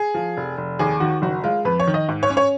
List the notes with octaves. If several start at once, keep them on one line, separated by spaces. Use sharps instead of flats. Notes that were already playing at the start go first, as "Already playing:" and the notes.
Already playing: G#4
F3
F1
F1
D#2 G#4
D#3 F#4
F#1 F#4
G#3 F4
F2 B4
C#5
D#3
D#5
G#2
C#5
C#4
C#5